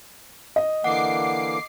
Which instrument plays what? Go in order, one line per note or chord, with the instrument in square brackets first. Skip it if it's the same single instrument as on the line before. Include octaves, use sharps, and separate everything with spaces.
[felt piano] D#5
[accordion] D3 E3 A#3 [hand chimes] F#5 [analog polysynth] D6 C7